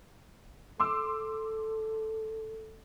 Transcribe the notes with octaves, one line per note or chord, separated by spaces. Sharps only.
A4 C6 D6 E6